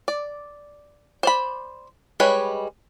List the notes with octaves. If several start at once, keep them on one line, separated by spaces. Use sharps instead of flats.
D5
C5 D5 B5
G3 G#3 B4 C#5